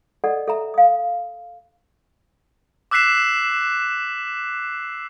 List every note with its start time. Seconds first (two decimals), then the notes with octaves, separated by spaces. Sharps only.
0.24 A4 D5 D#5 F#5
0.47 A4 E5 A#5
0.74 F5 D#6
2.91 D6 E6 F#6 B6 C7 E7